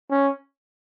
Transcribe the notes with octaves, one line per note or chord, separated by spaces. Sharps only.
C#4